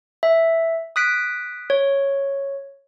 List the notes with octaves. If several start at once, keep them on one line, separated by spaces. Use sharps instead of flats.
E5
D#6 F#6 B6 D7
C#5